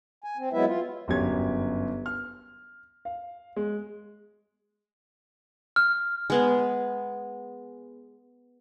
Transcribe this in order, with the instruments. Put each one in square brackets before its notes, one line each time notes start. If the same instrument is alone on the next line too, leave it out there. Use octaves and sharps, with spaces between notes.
[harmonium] G#5
C4
F#3 G#3 B3 E4 B4 E5
F4
[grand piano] G1 F#2 F#3 G4 G#6
F6
F5
G#3
[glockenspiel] F6
[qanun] G#3 B3 G#4